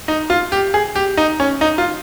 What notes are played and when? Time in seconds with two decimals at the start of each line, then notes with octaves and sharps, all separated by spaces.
0.08 D#4
0.30 F4
0.52 G4
0.74 G#4
0.96 G4
1.17 D#4
1.40 C#4
1.61 D#4
1.78 F4